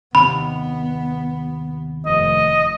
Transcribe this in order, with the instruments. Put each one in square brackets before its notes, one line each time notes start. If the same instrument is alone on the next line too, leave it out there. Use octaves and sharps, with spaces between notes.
[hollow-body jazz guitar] D#2 C3 [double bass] B3 [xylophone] B5
[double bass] F1 [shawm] D#5